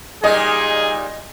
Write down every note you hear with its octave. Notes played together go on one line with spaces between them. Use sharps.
A#2 G3 D#4 G#4 D#5